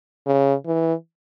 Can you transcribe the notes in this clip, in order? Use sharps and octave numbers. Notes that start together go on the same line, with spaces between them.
C#3
E3